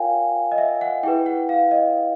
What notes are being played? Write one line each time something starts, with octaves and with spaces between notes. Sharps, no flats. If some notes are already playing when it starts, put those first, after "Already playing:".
Already playing: F4 A#4 C#5 F5 G5 G#5
D#5
E5
F#5
E4 G#4 B4 G5
F#5
F5
D#5